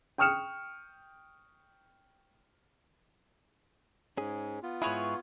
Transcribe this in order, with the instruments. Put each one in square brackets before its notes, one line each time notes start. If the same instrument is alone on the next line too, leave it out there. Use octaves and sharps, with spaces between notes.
[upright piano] G5 C#6 D#6 F6 C#7 E7
[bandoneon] G#2 [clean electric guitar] C#4 G#4
[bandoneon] B3 F4
[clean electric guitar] G#2 E4 [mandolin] G#4 B4 C#5